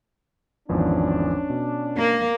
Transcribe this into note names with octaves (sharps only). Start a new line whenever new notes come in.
G#1 E2 F3 C#4 D4
B2
A#3